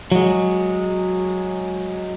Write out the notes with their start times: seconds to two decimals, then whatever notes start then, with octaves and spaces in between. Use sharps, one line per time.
0.12 F#3 G#3